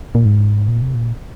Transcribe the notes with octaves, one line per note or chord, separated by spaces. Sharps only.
A#2
G#2
A#2
C3
A#2